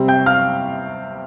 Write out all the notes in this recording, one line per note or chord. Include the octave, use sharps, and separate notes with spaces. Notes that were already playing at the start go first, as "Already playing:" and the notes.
Already playing: C3 G3 C4
G5 G6
F5 F6